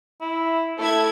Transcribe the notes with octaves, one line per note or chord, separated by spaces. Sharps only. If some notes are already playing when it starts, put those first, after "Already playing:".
E4
A3 E4 A4 G#6